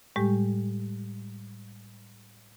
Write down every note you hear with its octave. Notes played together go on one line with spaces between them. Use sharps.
A2 G3 G#3 G4